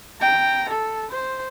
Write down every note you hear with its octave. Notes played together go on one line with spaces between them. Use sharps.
G5 A#5
A4
C5